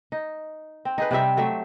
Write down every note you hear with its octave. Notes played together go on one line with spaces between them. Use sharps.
D#4
C4
D#4 G#4 B4
C3 G3 C4 E5
F#3 A3 G4 E5